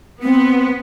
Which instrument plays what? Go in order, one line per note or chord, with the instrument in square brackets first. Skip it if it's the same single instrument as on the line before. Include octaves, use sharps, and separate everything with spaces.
[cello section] B3 [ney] C4